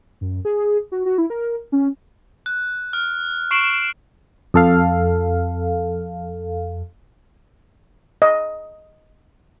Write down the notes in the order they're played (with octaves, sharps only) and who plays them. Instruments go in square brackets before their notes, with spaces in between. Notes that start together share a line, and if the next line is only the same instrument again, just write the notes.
[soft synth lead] F#2
G#4
F#4
F#4
E4
A#4
C#4
[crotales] F#6
F6
C#6 C7 D7 E7 F#7
[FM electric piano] F2 A4 F5
[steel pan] D#5